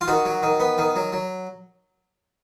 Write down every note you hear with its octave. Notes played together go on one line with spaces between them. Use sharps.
F4
D#3 F#4
F#3
D#3
B3
D#3
F#3
F#3